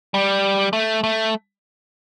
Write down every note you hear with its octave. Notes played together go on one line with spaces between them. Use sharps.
G3
A3
A3